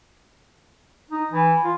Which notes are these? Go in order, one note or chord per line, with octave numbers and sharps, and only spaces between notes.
D#4
E3
F4